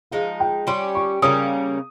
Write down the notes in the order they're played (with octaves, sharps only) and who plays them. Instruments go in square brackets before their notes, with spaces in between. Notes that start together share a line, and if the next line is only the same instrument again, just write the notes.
[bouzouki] F3 G#3 D#4 [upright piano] F5
[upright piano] G5
[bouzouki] G3 C#4 G4 [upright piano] C6
[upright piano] C#6
[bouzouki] C#3 G3 A#3 C#4 [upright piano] D#6